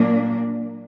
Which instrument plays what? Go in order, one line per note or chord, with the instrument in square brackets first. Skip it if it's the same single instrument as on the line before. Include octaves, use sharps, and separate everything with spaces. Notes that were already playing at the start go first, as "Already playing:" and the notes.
Already playing: [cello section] A#2 F#3 A#3 D4